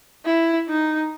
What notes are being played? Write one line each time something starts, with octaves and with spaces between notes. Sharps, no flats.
E4
D#4